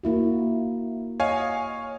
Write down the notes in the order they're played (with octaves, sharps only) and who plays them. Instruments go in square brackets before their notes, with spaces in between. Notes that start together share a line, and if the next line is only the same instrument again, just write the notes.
[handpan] A#3 E4 F#4
[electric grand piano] C#5 F5 G#5 [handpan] D#5 F#5